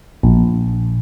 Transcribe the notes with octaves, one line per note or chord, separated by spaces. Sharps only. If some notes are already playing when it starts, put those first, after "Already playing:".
A#1